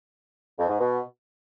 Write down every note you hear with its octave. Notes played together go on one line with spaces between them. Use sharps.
F2
G#2
B2